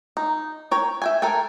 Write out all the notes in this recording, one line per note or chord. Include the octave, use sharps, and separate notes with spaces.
D#4
A#4 C#5 G5
E5 G5 G#5
A4 A#4 G5 G#5